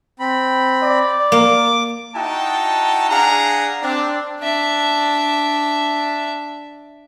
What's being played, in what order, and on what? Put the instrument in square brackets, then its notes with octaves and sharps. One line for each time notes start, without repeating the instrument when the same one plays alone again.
[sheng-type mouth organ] C4 B5
[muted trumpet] D5
[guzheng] A#3 [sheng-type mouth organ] D6
[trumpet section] D#4 E4 F#4 F#5 G5 A5
D4 G#4 F5 F#5 A#5
C4 D4
[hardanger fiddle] D4 E5